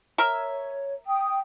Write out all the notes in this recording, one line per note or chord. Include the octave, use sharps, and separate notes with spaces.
A#4 C#5 E5
G5 D#6